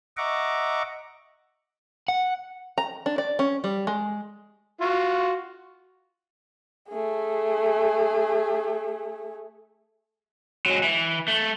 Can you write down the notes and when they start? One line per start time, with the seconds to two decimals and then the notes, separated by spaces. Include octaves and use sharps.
0.17 D#5 E5 F#5 A#5 C#6 D6
2.08 F#5
2.78 A#5
3.06 D4
3.18 D5
3.39 C#4
3.64 G3
3.87 G#3
4.81 F4 F#4
6.89 A3 G#4
10.66 F#3 G#3
10.83 E3
11.28 A3